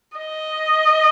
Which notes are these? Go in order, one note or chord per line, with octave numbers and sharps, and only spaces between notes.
D#5